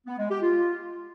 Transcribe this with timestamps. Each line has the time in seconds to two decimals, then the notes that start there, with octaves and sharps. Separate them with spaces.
0.07 B3
0.18 G#3
0.30 G4
0.42 F4